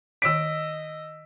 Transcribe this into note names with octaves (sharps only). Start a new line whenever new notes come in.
D#3 C#5 D#5 D6 E6 B6 D7